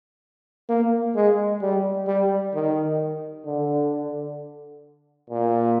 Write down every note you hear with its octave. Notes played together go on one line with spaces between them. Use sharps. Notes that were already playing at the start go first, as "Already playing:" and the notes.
A#3
G#3
G3
G3
D#3
D3
A#2